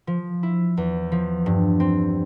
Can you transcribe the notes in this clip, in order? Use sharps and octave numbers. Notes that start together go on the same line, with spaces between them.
F3
E4
E2
F3
G2
C4